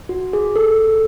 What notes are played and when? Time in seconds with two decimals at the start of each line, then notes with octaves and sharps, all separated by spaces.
0.09 F#4
0.33 G#4
0.56 A4